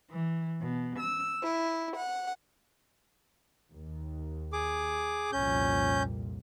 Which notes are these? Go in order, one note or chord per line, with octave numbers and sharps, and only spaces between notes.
E3
B2
E6
E4
F#5
D#2
G#4 D6
C2 F2 A#2 C#4 G6